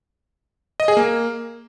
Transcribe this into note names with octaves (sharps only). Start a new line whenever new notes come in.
D#5
G#4
A#3